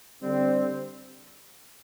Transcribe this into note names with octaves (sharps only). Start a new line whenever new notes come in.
D3 G3 C4